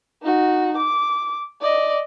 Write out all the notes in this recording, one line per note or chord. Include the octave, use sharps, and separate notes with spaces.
D#4 F#4
D6
D5 D#5